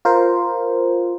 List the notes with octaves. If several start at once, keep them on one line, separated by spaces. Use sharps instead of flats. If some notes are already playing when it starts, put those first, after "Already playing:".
F4 A#4 C5